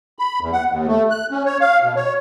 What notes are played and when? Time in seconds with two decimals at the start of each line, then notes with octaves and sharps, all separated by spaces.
0.19 B5
0.41 E2
0.53 F#5
0.68 D#2
0.87 A3
1.10 F#6
1.31 C#4
1.46 C#5
1.61 F5
1.83 B2
1.96 C#5